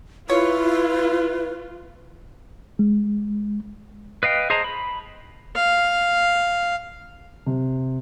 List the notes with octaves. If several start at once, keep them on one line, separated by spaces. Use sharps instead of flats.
E4 F4 B4 C#5
G#3
B4 D#5 F5 G5
G#4 C5 D#5 A5 A#5
B5
F5
C3